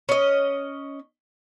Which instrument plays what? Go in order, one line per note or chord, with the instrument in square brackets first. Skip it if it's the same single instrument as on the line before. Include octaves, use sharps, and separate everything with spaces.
[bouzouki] C#4 D#5